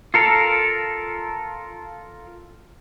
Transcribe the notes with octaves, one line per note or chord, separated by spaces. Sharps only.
F4 A4 A#4